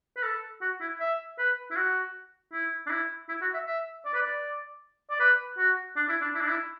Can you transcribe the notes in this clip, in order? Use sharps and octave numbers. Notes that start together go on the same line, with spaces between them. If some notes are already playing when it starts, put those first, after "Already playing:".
B4
A4
F#4
E4
E5
B4
E4
F#4
E4
D4
E4
E4
F#4
E5
E5
D5
B4
D5
D5
B4
F#4
D4
E4
D4
E4
D4
E4